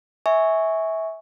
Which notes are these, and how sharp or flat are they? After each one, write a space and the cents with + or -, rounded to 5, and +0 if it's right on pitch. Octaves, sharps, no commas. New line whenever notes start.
E5 -25 G#5 +0 C#6 +0